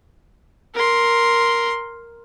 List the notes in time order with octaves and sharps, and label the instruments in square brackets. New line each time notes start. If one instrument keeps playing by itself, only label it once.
[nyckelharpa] A#4 C6